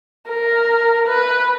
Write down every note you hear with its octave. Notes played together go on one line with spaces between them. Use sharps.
A#4
B4